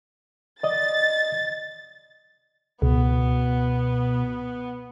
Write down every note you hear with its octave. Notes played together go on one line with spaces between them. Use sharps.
D5 D#5 A6
C#2 B2 B3